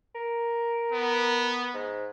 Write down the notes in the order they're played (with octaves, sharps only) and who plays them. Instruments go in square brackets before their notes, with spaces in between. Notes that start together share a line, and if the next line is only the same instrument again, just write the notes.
[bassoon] A#4
[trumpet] B3
[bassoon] G#2